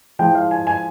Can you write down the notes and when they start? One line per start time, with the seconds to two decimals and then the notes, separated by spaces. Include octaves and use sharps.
0.19 F3 G#3 E4 G5
0.35 F5
0.51 G#5
0.67 G#5